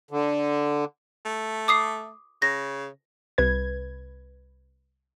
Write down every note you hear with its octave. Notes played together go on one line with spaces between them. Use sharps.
D3
A3
D6 D#6 C7
C#3 A#6
C2 B4 G#6